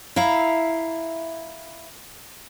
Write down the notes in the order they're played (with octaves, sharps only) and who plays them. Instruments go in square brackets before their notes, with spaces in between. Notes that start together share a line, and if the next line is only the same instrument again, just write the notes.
[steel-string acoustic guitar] E4 E5 F5 A#5